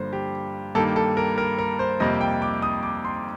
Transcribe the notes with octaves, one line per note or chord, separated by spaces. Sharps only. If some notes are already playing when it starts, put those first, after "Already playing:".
Already playing: G2 D3 F3 A#3 C5
G4
G2 D#3 G3 A#3 A4
A4
A#4
A#4
A#4
C5
F2 C3 G3 A#3 D#5
G5
D6
D#6
D6
C6